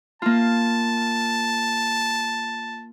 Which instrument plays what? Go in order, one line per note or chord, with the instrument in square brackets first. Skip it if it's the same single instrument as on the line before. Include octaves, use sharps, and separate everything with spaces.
[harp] A#3 F4 [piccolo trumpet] A5